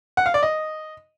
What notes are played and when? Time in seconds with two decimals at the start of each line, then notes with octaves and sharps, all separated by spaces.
0.17 F#5
0.26 F5
0.34 D5
0.43 D#5